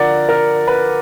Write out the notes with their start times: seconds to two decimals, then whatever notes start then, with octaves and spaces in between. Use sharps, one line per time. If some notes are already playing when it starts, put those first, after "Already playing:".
Already playing: D3 F3 A#4 D5 F#5
0.29 A#4
0.67 B4